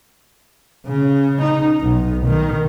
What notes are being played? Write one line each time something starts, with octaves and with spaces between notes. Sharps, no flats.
C#3
D#4
B1
D#3